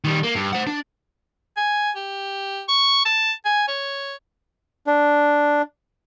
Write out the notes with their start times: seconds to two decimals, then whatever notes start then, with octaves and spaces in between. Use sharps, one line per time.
0.04 D#3 G3
0.23 A#3
0.35 G2
0.53 C5 F#5
0.67 D4
1.57 G#5
1.96 G4
2.68 C#6
3.05 A5
3.45 G#5
3.68 C#5
4.87 D4